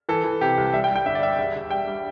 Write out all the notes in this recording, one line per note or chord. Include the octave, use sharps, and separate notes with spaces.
E3 A4
E3
C3 G4
C2
G3 E5
G5
G3
G5
G1 E5
D5
G3 E5
E1 E5
E1
G3 G5
G3